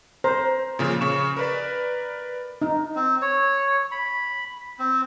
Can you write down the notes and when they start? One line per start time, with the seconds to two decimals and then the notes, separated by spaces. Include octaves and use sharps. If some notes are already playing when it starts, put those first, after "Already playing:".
0.24 C5 A#5
0.79 A#2 C#3 F3
1.01 C#3 C#6 E7
1.37 A#4 B4 D5
2.62 D#4
2.96 C4
3.22 C#5
3.92 B5
4.79 C4